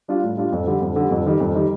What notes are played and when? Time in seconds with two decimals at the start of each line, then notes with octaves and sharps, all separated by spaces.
0.08 G3 D4 F4
0.23 A2
0.37 G3 D4 F4
0.52 F2
0.67 D3 G3
0.82 F2
0.96 D3 G3
1.11 F2
1.26 D#3 G3
1.40 F2
1.55 D#3 G3